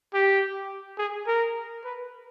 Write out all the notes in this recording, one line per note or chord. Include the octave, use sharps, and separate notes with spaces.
G4
G#4
A#4
B4